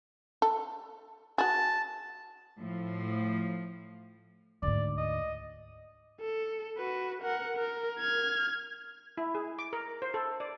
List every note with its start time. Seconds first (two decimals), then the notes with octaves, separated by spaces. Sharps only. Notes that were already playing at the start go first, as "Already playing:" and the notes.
0.42 A4
1.38 F#4 G#4 A5
2.58 A2 F3
4.62 D2 G#2 D5
4.98 D#5
6.21 A4
6.77 F#4 B4
7.22 A#4 F#5
7.58 A#4
7.99 F6 G#6
9.17 E4
9.35 G#4
9.59 D6
9.73 A#4
10.02 C5
10.14 A4
10.40 D5